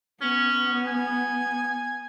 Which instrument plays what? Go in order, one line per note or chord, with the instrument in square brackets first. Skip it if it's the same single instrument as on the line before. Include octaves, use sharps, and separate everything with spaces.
[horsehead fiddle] B3 [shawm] C#4
[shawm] G#5